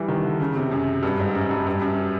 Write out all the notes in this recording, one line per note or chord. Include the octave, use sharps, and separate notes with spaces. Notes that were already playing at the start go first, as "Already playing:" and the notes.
Already playing: E3 G3
D#3
D3
C#3
C3
F#2
G2
G#2
F#2
G2
G2
F#2